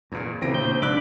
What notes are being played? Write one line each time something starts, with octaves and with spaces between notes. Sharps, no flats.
E2 A#2
D2 A2 C#3 E3 C4 A#6 D7
A#2 C5 G6
F1 G#2 D4 D5 B5 D6 E6 F#6